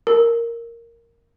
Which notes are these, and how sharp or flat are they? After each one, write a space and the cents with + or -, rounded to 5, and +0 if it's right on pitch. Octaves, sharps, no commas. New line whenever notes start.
A#4 -5